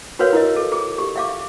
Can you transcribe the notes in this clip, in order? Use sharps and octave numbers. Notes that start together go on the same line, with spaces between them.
F#4 A#4 B4 C#5 F5
E4 A#4 D#5
A4
G#4
G4
E5 F5 D6